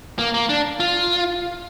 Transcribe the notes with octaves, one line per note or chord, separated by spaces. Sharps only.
A#3
A#3
D4
F4